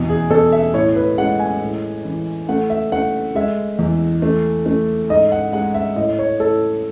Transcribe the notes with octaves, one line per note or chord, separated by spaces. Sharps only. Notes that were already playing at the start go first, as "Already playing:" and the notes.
Already playing: E2 B2
G#4
B2 A4
E5
A2 C#5
B4
G#3 F#5
G#5
A2
E3
A3 F#5
E5
A3 F#5
G#3 E5
E2
A3
A3
G#2 D#5
F#5
G#3 F#5
E5
A2 D#5
C#5
A2 A4